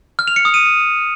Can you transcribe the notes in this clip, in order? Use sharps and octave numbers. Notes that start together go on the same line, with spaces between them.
F6
F7
C#7
D#6
D#7